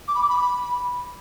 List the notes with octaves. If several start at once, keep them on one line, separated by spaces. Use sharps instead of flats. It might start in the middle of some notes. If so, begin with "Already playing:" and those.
D6
B5
D6
B5